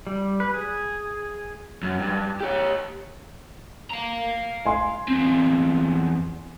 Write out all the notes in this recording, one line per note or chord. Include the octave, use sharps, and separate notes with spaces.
G3
B4
G#4
F#2
G2
G4 C#5
F5 A#5
G#5 C6
E2 C4